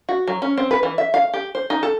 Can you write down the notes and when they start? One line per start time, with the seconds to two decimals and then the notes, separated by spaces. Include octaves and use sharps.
0.09 F#4
0.27 F#3
0.42 C#4
0.57 C4
0.71 B4
0.83 E3
0.98 E5
1.14 F5
1.34 G4
1.55 C5
1.70 D#4
1.83 A4